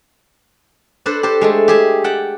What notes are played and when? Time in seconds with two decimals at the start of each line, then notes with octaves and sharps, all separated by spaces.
1.06 D4 A4 B4 C5
1.23 G4 A4 C5
1.41 G#3 A3 A4
1.68 G4 G#4 E5
2.04 F#5 G5 A5